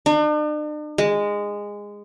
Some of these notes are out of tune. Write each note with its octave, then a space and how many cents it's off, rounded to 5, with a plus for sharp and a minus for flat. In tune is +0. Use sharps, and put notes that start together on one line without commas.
D4 +45
G#3 -15